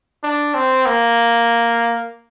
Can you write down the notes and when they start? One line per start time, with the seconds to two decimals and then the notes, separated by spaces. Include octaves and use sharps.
0.23 D4
0.55 C4
0.86 A#3